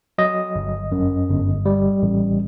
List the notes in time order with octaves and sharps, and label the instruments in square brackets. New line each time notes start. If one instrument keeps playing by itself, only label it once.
[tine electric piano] F#3 D#5
G1
F#2
G1
G3
A1